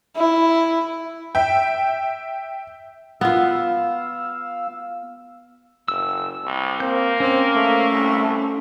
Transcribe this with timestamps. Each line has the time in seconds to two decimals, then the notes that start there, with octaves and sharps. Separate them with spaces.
0.17 E4
1.35 E5 G5
3.21 B3 F4 F5 E6
5.88 F#1 E6
6.44 C2
6.80 A#3 C4 G6
7.20 C4 C#4
7.56 A3
7.91 C2